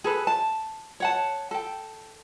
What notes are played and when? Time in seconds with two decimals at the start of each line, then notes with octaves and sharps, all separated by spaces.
0.04 G#4 A4 B4
0.27 A5
1.00 C#5 F#5 A5
1.51 A4 G5